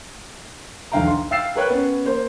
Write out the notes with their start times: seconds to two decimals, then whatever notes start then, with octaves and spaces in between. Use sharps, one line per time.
0.92 B1 E2 D3 F5 G5 A#5
1.07 C6
1.31 F5 G5 E6 A6 C7 E7
1.56 A#4 B4 C#5 G5 F#6
1.70 B3 C#4
2.06 A#3 C5